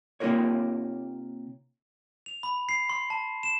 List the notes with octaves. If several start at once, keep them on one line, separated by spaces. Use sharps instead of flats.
C3 A#3 D#4 F4 A#4 C#5
F7
B5
C7
C6
A5
E7